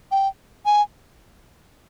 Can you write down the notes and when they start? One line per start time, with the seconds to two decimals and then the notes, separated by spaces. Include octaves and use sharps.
0.11 G5
0.66 G#5